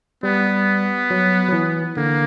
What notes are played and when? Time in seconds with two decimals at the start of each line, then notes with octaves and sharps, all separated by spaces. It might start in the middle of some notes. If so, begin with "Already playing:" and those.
0.23 G3 B3
1.11 F#3
1.48 F#3
1.53 E3
1.96 D3 A#3